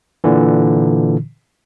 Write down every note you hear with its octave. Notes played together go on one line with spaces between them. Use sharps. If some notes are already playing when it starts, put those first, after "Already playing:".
A#2 D3 E3